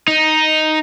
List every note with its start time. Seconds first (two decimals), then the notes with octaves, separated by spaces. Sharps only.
0.08 D#4